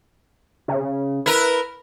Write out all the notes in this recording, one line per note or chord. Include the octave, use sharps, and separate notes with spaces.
C#3
E4 A#4 B4